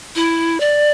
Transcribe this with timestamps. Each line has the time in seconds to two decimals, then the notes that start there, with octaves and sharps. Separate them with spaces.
0.15 E4
0.60 D5